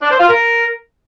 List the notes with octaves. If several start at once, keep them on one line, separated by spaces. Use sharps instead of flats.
D4
C5
F4
A#4